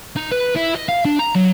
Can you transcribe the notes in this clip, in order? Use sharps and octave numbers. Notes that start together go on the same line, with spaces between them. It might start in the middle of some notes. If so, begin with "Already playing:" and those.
D#4
B4
E4
D#5
F5
D4
A#5
F#3